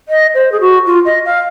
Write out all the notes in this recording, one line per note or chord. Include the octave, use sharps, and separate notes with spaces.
D#5
C5
G#4
F#4
F4
D#5
F5